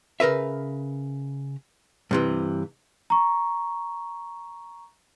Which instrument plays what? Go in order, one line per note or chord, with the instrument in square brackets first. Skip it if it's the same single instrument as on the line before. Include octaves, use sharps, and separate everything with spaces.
[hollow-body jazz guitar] C#3 A#4 B4 E5
G2 C3 E3
[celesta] A#5 C#6